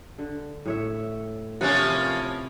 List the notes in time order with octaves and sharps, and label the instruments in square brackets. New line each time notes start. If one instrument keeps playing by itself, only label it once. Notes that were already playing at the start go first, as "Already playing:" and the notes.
[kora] D3
A2 C#5 E5
[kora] C3 B4 F#5 [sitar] F3 A#3 C#4